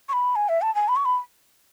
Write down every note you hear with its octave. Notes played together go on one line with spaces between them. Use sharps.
C#6
B5
G#5
E5
A5
G#5
B5
C#6
B5